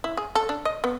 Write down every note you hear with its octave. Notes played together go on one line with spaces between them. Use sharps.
E4
G#4
A4
D4
D#5
B3